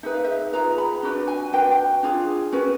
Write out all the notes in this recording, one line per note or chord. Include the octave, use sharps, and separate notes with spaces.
D#4 G#4 B4 E5
F5
E5
F4 G#4 B4 A#5
B5
D4 F#4 B4
G#5
D4 F#4 B4 G5
D4 F4 G#4
C#4 F#4 B4